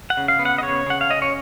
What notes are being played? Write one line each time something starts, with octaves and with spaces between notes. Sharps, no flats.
F#5
C#3
F5
B3
F#5
D#5
C#3 C#5
C#3 F#5
F5
C#4 D#5
C#5